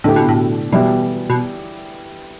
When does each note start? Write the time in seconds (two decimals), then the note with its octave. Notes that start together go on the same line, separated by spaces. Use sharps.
0.04 A2 D3 A3 E4 G4
0.16 B2
0.29 A2
0.72 B2 E3 G3 B3 E4 G4
1.30 B2